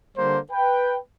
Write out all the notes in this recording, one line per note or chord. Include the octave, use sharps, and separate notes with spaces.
D3 G3 A#3 C5
B4 G5